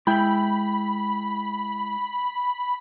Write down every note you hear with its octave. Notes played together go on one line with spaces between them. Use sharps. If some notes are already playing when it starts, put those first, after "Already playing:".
G#3 E4 G5 B5